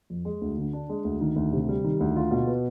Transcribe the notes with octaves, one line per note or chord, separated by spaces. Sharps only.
F2
G#3
D2
D3
D4
G#3
D2
D#3
D2
C3
G3
D#3
D2
F4
B2
B3